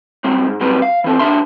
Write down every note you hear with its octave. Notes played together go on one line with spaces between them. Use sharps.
F#2 G3 C4
G#2
C2 F#3 G3 C4 B4
F5
E3 C4 A4
D3 G3 D4 E5 C6